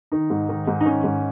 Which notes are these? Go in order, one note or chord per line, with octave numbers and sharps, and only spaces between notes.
D#3 D#4
G#2
D#3 D#4
G#2
D#4
D#3 C#4
G#2